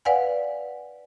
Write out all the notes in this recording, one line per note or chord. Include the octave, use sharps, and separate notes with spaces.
B4 D5 F5 F#5 G#5